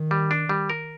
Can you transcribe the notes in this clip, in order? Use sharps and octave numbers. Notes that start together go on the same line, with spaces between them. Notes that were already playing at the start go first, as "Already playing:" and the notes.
Already playing: D#3
G3
D4
G3
A#4